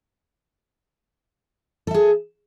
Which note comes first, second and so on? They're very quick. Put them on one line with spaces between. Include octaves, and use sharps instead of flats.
A4 E5 G#4